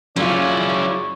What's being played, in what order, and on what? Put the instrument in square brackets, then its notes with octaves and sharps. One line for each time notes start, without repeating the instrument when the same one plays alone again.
[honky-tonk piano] F#1 F4 [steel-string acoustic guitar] F#3 [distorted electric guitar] C#4 E4 [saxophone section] G#4 C#5 D5